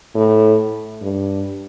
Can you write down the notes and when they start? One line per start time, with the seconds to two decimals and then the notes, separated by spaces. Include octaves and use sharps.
0.15 A2
1.02 G2